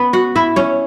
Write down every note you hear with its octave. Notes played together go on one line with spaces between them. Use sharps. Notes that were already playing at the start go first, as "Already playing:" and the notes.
Already playing: B3 C#4 B4
F#4 F#5
E4 E5
C#4 C#5